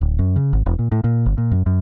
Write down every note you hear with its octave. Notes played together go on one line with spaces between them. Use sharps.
D1
F#2
C#3
G#1
E1
A#2
A2
A#2
G1
A#2
F#2
F#2